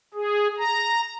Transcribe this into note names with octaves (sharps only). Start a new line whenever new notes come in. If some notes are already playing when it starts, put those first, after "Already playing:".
G#4
A#5